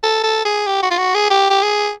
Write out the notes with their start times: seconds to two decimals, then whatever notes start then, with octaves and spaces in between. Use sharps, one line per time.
0.03 A4
0.24 A4
0.45 G#4
0.67 G4
0.82 F#4
0.91 F4
0.98 F#4
1.15 G#4
1.30 G4
1.50 G4
1.62 G#4